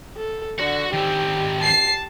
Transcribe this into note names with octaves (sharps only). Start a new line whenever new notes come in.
A4
D3 F#4 F#5
D#3 C4 G4
A5 C7